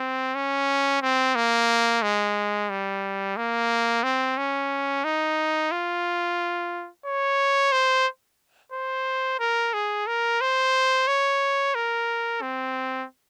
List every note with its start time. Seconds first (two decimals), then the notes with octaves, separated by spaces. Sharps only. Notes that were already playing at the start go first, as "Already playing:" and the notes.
Already playing: C4
0.35 C#4
1.02 C4
1.36 A#3
2.03 G#3
2.70 G3
3.37 A#3
4.03 C4
4.38 C#4
5.04 D#4
5.72 F4
7.06 C#5
7.72 C5
8.72 C5
9.40 A#4
9.74 G#4
10.07 A#4
10.41 C5
11.08 C#5
11.75 A#4
12.42 C4